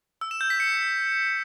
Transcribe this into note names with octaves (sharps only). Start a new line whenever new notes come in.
E6
E7
G6
B6
C#7